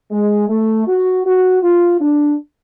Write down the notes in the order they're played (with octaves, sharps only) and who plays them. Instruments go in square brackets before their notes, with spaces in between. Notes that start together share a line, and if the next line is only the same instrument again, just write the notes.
[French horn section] G#3
A3
F#4
F#4
F4
D4